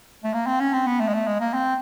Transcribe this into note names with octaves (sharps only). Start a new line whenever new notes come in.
A3
A#3
C4
C#4
C4
B3
A3
G#3
A3
G#3
A#3
C4